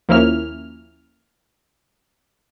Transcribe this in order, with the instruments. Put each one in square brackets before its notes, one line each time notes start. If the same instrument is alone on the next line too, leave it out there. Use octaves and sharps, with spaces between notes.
[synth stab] D#2 F3 A#3 C#4 E4 F6